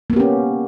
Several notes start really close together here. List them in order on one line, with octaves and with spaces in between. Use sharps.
A#3 B3 G4 C#4